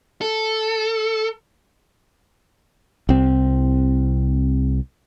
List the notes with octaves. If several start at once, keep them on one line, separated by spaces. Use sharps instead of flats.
A4
C2 C4